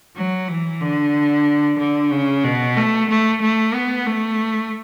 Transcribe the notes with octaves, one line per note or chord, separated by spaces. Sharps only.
F#3
E3
D3
D3
C#3
B2
A3
A3
A3
B3
A3